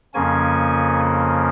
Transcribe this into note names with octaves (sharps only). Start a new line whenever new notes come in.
F2 C#3 F3 A#3 C#4 G#5